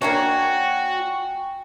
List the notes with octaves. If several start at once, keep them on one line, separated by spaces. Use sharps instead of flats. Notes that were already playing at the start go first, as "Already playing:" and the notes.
A#3 D4 F#4 C#5 G5 G#5 C#6